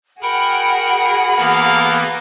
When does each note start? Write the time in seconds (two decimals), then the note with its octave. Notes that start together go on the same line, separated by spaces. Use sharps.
0.22 F#4 G#4 A#4 F#5 G5 B5
1.37 E3 A#3 B3 A4 A#4 F5